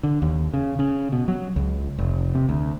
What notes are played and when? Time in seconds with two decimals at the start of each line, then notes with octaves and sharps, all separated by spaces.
0.03 D3
0.22 D#2
0.54 C#3
0.79 C#3
1.12 B2
1.28 F#3
1.56 C#2
1.98 F1
2.35 C3
2.49 D2